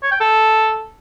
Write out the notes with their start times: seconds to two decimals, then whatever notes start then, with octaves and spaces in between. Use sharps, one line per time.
0.03 C#5
0.12 G5
0.20 A4